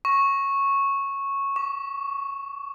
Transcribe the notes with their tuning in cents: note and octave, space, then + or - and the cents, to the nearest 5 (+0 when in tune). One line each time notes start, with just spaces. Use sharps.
C#6 -10
C#6 +35